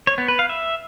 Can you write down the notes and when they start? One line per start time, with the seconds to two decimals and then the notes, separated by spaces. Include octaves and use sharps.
0.07 C#5
0.18 B3
0.28 B4
0.39 F5
0.49 E5